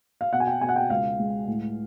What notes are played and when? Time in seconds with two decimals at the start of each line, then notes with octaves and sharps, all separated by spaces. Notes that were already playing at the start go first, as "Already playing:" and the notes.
0.21 F5
0.33 B2 F#5
0.40 G#5
0.47 G5
0.61 B2 G#5
0.69 F#5
0.76 G5
0.90 C#2 F5
1.19 G#3
1.47 A2